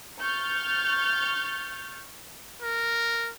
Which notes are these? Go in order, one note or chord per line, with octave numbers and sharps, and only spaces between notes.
C#6 F6 G6 A6
A#4